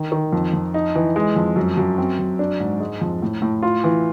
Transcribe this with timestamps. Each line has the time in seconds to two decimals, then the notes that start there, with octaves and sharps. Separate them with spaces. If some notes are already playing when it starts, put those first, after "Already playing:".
Already playing: D#3
0.12 D#3
0.33 F2
0.53 F2
0.74 D#4
0.95 E3
1.16 G#3
1.36 F2
1.56 F#2
1.77 F#2
1.98 C4
2.19 F#2
2.39 D4
2.60 G#2
2.80 G#3
3.01 F2
3.22 A2
3.42 A2
3.63 F4
3.84 E3